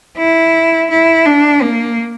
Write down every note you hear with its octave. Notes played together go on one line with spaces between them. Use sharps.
E4
E4
D4
A#3